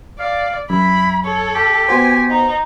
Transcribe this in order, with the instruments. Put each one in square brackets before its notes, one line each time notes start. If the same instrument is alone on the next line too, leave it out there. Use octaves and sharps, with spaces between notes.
[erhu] D5 [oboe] F5
[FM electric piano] F#2 [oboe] E4 [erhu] B5
[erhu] A4 [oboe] C#5
[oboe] G4
[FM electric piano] B3 F#4 C5 [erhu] G#5
[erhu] D#4